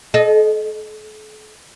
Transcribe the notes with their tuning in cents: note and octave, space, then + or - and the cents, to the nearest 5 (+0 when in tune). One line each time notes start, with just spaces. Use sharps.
A4 -40 D#5 +0